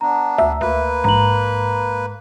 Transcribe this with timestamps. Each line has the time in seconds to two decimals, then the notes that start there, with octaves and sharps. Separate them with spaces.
0.01 B3 D4 A#5
0.38 D2 E5
0.61 D2 A#3 B4
1.04 A#1 G#2 A#5 F#7